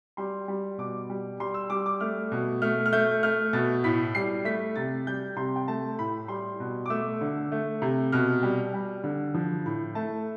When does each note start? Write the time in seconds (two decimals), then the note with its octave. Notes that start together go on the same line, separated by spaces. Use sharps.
0.17 G3 C6
0.48 G3
0.78 B2 D6
1.10 G3
1.40 G3 C6
1.54 E6
1.70 G3 D6
1.86 D6
2.01 A3 F6
2.32 B2
2.62 A3 F6
2.86 F6
2.93 A3 G6
3.23 A3 F6
3.53 B2 A6
3.84 A2 B6
4.15 G3 C7
4.45 A3 B6
4.76 C3 A6
5.07 G3 G6
5.37 C3 C6
5.56 G5
5.68 A3 A5
5.99 A2 B5
6.28 G3 C6
6.60 B2
6.86 D6
6.90 A3 E6
7.21 D3
7.52 A3
7.82 C3
8.12 B2 F6
8.43 G3
8.74 G3
9.04 D3
9.34 F3
9.66 A2
9.95 A3 A5